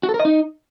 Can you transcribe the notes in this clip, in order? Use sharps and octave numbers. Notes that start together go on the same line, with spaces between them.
F#4
A4
A#4
D#5
D#4